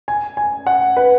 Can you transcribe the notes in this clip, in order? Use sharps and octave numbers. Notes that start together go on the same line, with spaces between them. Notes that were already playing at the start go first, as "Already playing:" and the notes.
G#5
G#5
F#5
B4